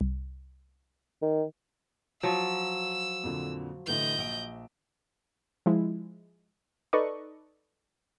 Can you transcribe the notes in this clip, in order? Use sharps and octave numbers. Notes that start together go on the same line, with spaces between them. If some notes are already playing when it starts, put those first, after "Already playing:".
C2
D#3
F3 F#3 E6
F2 A#2 D3
A2 D3 E3 D#5 G6
A#1 D7
F3 G#3 E4
D#4 A4 B4 D5 D#5 C#6